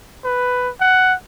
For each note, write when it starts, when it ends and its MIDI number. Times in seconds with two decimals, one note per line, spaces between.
0.24 0.70 71
0.81 1.14 78